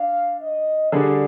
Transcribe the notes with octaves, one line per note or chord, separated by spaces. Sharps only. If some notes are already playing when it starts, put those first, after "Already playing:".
Already playing: D4 F5
D#5
D3 G3 D4 G#4 D5